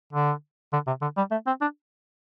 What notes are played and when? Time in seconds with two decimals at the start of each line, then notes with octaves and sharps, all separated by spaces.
0.13 D3
0.73 D3
0.87 C3
1.02 D3
1.17 G3
1.31 A3
1.47 C4
1.61 D4